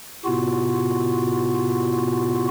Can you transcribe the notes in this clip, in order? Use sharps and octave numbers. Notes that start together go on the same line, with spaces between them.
A2 C3 B3 F4 F#4